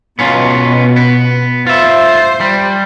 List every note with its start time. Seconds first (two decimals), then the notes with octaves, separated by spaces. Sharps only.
0.19 B2 B3 C#4 F4
0.96 B3
1.67 F4 C5 E5
2.41 G3